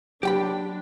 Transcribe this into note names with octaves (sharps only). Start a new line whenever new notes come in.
F#3 D4 G4 G5 B5